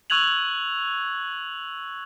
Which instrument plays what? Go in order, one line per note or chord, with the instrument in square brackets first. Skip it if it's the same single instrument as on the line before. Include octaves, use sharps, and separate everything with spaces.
[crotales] C#6 E6 F#6 G#6 F7 F#7